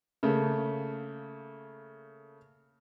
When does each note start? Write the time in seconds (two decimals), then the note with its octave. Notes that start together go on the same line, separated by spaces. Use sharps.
0.23 C#3 A3 A#3